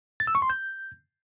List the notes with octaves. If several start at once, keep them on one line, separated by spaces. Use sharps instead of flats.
A6
E6
C#6
C6
G6